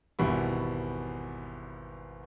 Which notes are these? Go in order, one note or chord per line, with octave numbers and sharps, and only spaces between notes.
G#1 E2 B2 G3 E4